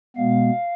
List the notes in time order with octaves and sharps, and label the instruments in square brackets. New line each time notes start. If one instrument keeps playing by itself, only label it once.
[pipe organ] B2 G#3 B3 F5